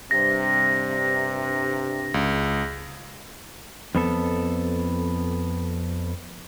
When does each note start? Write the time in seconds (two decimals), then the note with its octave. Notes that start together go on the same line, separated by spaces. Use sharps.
0.11 G2 C3 A#6
2.14 C#2
3.95 F2 B3 A4